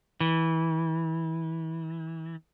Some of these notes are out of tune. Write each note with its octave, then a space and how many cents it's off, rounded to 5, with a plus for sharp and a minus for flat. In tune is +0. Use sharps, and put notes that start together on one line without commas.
E3 -25